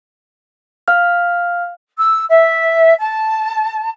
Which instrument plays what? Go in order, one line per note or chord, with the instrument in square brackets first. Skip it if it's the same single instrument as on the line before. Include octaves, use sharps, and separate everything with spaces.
[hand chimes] F5 F6
[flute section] E6
E5
A5